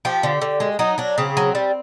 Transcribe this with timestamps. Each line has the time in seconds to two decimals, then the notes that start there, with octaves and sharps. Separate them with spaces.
0.05 F3 G4
0.23 D3
0.42 D3
0.60 G#3
0.79 F#3 D#4
0.98 F#3 D4
1.18 C#3 C4
1.37 F#3
1.55 G3